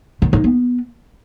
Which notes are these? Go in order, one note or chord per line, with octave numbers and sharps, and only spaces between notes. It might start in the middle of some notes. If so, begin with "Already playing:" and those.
D#3
D#4
B3